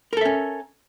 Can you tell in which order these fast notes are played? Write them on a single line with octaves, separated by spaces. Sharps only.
A#4 A4 E5 C#4